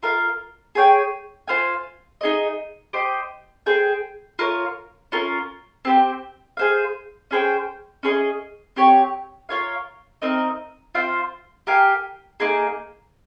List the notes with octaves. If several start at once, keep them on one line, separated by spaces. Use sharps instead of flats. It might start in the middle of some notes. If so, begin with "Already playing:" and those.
F4 A#4 F5
G#4 C#5 G5
F4 C5 F5 G#5
D#4 G#4 D#5
G4 C5 D#5
G#4 C5 G5
F4 A#4 C#5
C#4 F4 A#4
C4 G4 C5
G#4 C5 F5
C#4 G#4 C5 G5
C#4 G#4 C5 D#5
C4 G4 C#5
F4 A#4 C#5 F5
C4 D#4 A#4 D#5
C4 F4 C5 F5
G4 A#4 F5 G#5
A#3 D#4 G#4